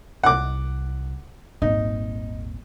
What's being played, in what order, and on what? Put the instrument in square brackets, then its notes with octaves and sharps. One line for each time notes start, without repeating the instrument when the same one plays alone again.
[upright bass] C2 [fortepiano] F#5 D6
[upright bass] D#1 G#1 [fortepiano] D#4